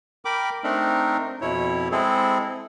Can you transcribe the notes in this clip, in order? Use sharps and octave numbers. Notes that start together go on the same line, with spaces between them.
A#4 G5 B5 D6
A3 C4 D4 D#4 A#4
F2 B2 E4 C#5
G#3 C4 E4 G#4 A4